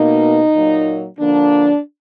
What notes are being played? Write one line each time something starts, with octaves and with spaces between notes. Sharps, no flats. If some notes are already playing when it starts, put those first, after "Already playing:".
Already playing: B2 A#3 D#4
A#2 F#3 A#3
D3 F3 A#3 D4